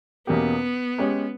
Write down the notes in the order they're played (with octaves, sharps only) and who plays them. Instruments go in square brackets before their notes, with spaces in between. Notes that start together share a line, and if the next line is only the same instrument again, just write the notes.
[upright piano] E2 B2 A#3 C#4 G4 [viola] B3
[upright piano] G#3 C#4 G4 C#5